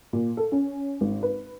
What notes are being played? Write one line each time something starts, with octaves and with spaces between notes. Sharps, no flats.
A#2
A4
C#4
G#1
B4